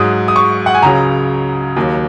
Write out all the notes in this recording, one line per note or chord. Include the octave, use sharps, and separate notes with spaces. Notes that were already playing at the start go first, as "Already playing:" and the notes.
Already playing: G#2 F#3 D#6
D#6
C#6
F#5
G#5
C#2 C#3 F#3 A#5
D#2 D#3 F#3